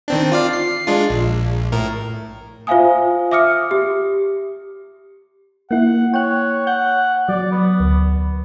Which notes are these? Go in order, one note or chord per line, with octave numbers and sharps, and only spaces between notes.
D#3 C4 D4
F4 D5 F5
C7
G#3 D4 F4
A#1
A2 A#4
F4 C5 E5 F5 G#5 D#6
E5 D6 D#6 F6 C#7
G4
A#3 E4 F#5
C#5 G5 F#6
F#5 G6
F#3 D5
B3
D2